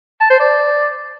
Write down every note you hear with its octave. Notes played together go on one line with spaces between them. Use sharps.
A5
C5
D5